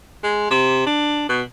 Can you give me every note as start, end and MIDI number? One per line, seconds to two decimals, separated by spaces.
0.23 0.46 56
0.51 0.86 48
0.87 1.27 62
1.29 1.43 47